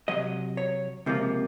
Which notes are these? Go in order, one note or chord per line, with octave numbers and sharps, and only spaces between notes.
C3 D#3 F#3 D#5
C#5
C#2 C3 F3 A#3 F4